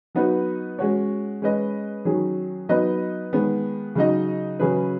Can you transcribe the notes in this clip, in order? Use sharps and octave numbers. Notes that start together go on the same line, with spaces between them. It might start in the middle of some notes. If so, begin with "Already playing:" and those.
F#3 B3 D#4 F#4 B4
G#3 C#4 F#4 C#5
G#3 C#4 B4 D#5
D#3 F#3 C#4 G#4
F#3 B3 D#4 B4 D#5
D#3 G#3 B3
C#3 F#3 D#4 F#4 D#5
C#3 F#3 C#4 G#4 B4